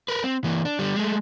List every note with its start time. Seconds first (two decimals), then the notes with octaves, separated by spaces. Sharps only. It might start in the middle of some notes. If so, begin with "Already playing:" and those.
0.08 A#4 B4
0.24 C4
0.44 E3 A#3
0.65 D4
0.79 D3 G3
0.96 G#3 A3